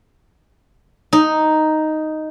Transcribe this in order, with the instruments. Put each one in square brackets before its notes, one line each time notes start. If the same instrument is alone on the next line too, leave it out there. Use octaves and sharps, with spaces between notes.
[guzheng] D#4